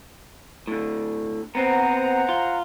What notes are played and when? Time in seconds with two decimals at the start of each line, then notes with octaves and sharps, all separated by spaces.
0.67 A2 D3
1.55 B3 C4 C5 F#5 A#5
2.29 F4